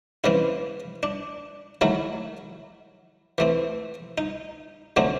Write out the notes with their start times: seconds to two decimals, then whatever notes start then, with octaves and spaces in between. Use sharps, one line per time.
0.24 C#3 E3 G#3 C4 E4
1.03 D4
1.81 D#3 F#3 A3 E4
3.38 E3 A3 C4
4.18 D#4
4.96 D3 F#3 A3 C4